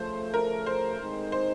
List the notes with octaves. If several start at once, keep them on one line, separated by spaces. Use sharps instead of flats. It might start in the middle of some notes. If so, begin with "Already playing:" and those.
Already playing: C#3 F3 A3 C5
A#4
C5
D#3 G#3 C4 D#4
C5